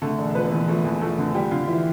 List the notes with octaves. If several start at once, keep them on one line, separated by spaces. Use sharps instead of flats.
D3 A3 A4
E1
F3 B3 B4
E2
F3 A3 A4
E2
F3 A3 A4
D3
F3 G3 G4
D3 F3 F4
E3 F3 E4